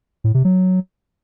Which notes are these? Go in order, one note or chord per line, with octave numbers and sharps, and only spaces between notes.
A2
C3
F#3